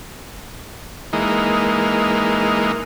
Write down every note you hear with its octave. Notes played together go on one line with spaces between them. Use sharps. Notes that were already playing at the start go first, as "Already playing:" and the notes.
E3 G#3 A#3 D#4